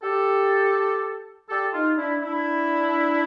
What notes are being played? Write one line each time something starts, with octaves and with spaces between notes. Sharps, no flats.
G4 A4
G4 A4
D#4 F4
D4 E4
D4 E4